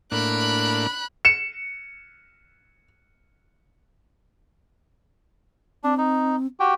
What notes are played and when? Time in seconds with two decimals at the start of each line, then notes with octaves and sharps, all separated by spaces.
0.12 A2 A#3 D4 B5 F#6
1.25 C#7 E7
5.84 C4 D4
5.98 D#4
6.60 F#4 G4 G5